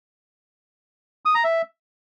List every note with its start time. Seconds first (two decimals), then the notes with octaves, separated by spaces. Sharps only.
1.25 D#6
1.35 A#5
1.44 E5